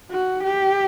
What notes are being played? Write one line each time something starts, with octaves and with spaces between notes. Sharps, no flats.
F#4
G4